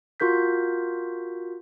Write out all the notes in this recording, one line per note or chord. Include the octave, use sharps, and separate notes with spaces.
F4 F#4 A#4 G6 B6